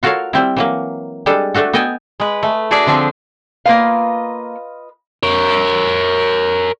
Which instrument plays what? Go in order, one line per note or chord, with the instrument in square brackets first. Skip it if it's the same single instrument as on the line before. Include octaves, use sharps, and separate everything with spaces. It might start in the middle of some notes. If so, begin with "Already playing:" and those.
[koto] F4 F#4 A4 A#4 C#5 F5
G3 C4 E4
E3 F#3 A#3
G3 G#3 D4 A4
A3 D4 F#4 A4
B3 A4 D#5 G5 G#5
G#3 B4
A3
D4 F#4 G#4 A4 D5 E5
D3 F3 C4 D4
[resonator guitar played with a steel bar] A#3 F5 [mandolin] F4 B4 D#5
[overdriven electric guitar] A#4 C#5